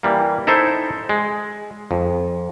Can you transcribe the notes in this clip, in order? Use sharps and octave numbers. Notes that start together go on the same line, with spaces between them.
E3 G3 A#3
D#4 E4 A4 C5 E5
G#3
F2